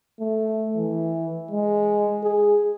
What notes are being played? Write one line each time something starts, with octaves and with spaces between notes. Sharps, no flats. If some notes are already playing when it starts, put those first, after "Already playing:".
A3
E3
G#3
G#4